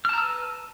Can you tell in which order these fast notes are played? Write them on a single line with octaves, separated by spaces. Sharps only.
F6 A5 A#5 E6 B4